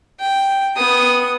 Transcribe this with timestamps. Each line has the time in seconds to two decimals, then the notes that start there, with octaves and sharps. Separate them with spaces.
0.20 G5
0.77 B3 D#6